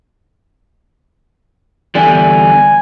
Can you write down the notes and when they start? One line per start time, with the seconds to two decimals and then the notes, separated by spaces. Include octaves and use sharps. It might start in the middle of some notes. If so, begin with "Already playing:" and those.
1.95 E2 D3 G3 G#5